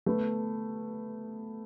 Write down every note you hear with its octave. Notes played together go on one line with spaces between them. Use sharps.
A3 B3